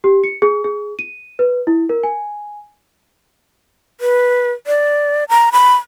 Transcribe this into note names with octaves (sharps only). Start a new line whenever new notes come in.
G4
C#7
G#4
G#4
D#7
B4
E4
A#4
G#5
B4
D5
A#5
B5